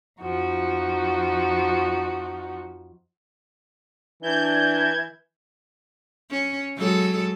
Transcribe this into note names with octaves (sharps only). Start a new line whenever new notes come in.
F2 F3 D#4 F#4
E3 D4 G6 G#6
C#4
F#3 G#3 A4